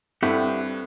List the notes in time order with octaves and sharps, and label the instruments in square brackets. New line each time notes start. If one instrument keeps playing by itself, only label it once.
[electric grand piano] G2 [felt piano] C4 E4 A4 [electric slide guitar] G4 E5 F#5